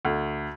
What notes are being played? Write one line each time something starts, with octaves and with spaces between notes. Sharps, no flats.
D2